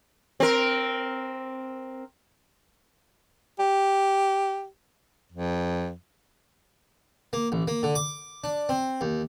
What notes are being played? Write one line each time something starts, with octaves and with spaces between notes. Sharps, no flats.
C4 A#4
G4
F2
A#3
A1
A#3
D3
D6
D4
C4
D#2